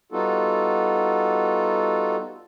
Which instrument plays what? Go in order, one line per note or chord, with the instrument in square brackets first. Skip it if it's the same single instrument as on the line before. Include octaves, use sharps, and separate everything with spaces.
[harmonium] G3 B3 D#4 F4 F#4 A4